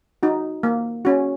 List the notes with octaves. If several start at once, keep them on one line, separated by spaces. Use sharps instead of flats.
D#4 F#4
A#3
C#4 F#4